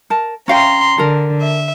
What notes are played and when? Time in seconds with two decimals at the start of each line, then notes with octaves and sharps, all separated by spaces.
0.10 A#4 A5
0.48 C#4 F5 G5 A#5 C6
0.98 D3 A4 A#4
1.41 E5